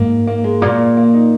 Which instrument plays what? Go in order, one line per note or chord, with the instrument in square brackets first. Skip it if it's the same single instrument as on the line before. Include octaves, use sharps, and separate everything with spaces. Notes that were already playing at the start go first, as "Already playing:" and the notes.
Already playing: [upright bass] G#2 [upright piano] A#3
[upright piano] A#3
G#3
[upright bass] A#2 [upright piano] A#3
[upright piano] A#3
D#4